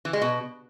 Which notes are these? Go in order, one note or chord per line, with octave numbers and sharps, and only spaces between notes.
E3
G#3
B2